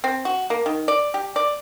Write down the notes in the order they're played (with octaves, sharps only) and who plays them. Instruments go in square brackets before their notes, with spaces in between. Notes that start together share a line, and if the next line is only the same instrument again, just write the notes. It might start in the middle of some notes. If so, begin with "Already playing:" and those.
[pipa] C4
F#4
A#3
D#3
D5
G4
D5